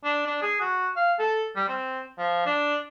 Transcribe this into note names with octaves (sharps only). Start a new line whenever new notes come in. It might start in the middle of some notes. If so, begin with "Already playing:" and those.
D4
D4
G#4
F#4
F5
A4
G3
C4
F3
D4